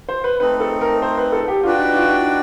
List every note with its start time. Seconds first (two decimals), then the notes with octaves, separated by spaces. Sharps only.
0.09 C5
0.24 B4
0.40 A3 C4 D#4 B4
0.60 A4
0.81 A#4
1.02 C5
1.18 B4
1.32 A4
1.48 G4
1.63 D4 F4 F#4 B4 D5 G5
1.79 D#4
1.95 F4
2.10 E4
2.25 D#4